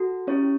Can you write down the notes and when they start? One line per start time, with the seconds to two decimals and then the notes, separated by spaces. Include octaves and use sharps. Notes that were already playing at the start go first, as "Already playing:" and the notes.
Already playing: F#4 A4
0.27 C#4 E4 G4 C#5